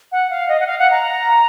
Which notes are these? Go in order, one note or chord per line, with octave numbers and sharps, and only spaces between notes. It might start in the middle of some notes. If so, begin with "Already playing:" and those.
F#5
F5
D#5
F#5
F5
F#5
A#5